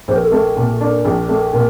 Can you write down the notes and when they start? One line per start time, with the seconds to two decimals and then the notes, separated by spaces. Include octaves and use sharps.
0.08 A#1 C5
0.16 A#4
0.23 A4
0.31 A3 A#4
0.56 A#2
0.81 D4
1.05 A#1
1.29 A3
1.53 A#2 A#4